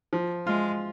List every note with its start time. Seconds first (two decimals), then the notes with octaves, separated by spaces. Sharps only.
0.13 F3
0.47 G#3 F4